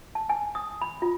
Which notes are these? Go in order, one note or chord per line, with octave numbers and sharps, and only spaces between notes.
A5
G#5
D#6
B5
F4